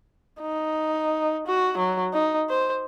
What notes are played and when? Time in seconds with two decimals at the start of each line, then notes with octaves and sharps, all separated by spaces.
0.41 D#4
1.47 F#4
1.78 F#3
2.13 D#4
2.50 C5